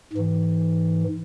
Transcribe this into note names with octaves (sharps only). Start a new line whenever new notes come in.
G#2 E3